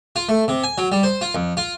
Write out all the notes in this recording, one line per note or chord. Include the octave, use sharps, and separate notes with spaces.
F4
A3
C3
G#5
F#3
G3
C5
F4
F2
F4